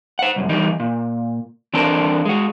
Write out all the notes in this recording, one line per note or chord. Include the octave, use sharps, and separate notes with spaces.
C5 F#5
C2 F#2
E2 E3 G3 D#4
A#2
E3 C4 D4 A4 A#4 C5
G#3 F#4